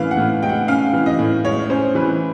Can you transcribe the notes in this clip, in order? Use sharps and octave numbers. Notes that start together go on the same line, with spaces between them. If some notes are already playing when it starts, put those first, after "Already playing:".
Already playing: A2 E3 C#4 F5
F#5
A2
G#3 G5
F#5
C#4 F5
E3
D#5
A2
G#3 C#5
C#4 C5
E3 B4